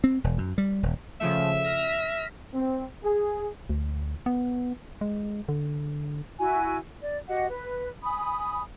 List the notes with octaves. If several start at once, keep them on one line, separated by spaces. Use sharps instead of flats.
C4
E1
F#2
G3
D#1
C#3 F3 A3 E5
F6 A#6 B6
C4
G#4
D2
B3
G#3
D3
E4 F#4 G#5
D5
F#4 G4 D#5 F#5
B4
G#5 B5 D#6